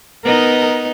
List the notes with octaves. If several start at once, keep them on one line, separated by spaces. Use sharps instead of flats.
B3 D#4 A#4 D#5